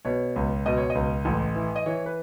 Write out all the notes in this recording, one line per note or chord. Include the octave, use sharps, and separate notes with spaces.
B2 C#5
C#2
B2 D#5
C#5
D#5
C#2
A1
E3
D#5
E3 C#5
B4